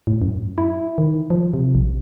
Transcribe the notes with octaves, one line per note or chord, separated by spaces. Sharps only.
A2
F#2
E4
D#3
F3
C3
A#1